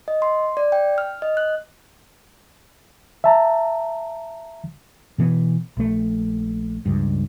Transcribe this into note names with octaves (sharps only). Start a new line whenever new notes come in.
D#5
C6
D5
G5
F6
D#5
F#6
E5 A5 A#5
B2 E3 B3
A#1 A3
C#2 G2